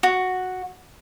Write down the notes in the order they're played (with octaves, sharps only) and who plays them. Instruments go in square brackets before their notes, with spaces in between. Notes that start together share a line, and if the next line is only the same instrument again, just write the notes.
[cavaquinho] F#4